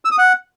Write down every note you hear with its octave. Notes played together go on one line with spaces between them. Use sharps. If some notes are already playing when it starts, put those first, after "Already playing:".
E6
D#6
F#5